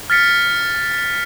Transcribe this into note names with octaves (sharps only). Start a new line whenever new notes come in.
F6 A6 B6 C#7